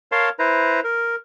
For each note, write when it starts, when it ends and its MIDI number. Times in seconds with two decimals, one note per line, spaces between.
0.12 0.29 70
0.12 0.29 73
0.12 0.29 77
0.12 0.29 81
0.12 0.29 84
0.39 0.80 64
0.39 0.80 71
0.39 0.80 72
0.39 0.80 82
0.84 1.16 70